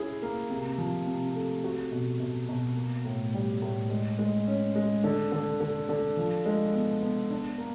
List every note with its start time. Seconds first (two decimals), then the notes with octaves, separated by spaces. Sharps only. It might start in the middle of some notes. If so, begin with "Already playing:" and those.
Already playing: C#4 E4 G#4
0.22 A#3
0.50 C3
0.78 F3
1.07 C3
1.35 A3
1.64 F#4
1.92 B2
2.20 B2
2.49 B2
2.77 A#3
3.05 A2
3.34 G3
3.62 A2
3.90 G#3
4.19 G#3
4.47 C#4
4.76 G#3
5.04 D3
5.32 D3
5.60 D3
5.89 D3
6.17 F3
6.46 G#3
6.74 B3
7.02 B3
7.30 D4
7.58 A#3